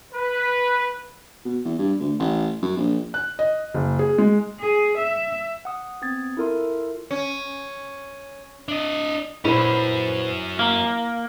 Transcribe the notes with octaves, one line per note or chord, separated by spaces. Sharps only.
B4
B2
E2
G2
D2
A1
F#2
A#1
F#6
D#5
F#1
G#4
G#3
G#4
E5
F#5 D#6
B3 C4 D#6 G#6 A6
E4 F4 A4 A#4 E5 C6
C#4
D4 D#5
A#2 F#3 C#4 E4 B4 C5
A#3 A#5